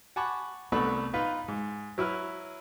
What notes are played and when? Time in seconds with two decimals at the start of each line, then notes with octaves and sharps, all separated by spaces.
0.16 F#5 G#5 A5 B5 C#6 D6
0.72 C2 A3 B3 D4 B5 C#6
1.14 D#4 F4 B4
1.48 G#2
1.98 F#3 E4 B4 F6